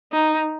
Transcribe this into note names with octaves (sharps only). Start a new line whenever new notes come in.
D#4